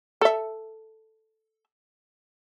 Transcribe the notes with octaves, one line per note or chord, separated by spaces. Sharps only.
A4 E5